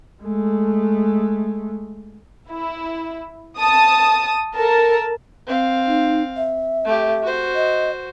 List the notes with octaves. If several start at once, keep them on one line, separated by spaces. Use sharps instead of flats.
G#3 A3
E4
A5 D#6
A4 A#4 A5
C4 F5
D#4
E5
A3 G4
F#4 C5
D#5